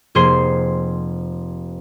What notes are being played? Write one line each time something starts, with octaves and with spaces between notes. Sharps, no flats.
F1 A#3 G#4 C5 C6 C7